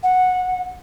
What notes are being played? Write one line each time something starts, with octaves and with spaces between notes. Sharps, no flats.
F#5